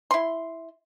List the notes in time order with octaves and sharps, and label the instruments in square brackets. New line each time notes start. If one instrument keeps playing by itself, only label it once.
[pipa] E4 C6